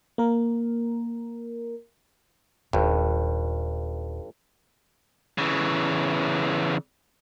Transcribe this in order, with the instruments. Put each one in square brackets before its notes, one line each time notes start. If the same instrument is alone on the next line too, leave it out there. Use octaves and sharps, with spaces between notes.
[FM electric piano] A#3 A#4
[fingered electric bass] D#1 [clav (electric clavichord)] G#1 G2
[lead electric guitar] C#3 E3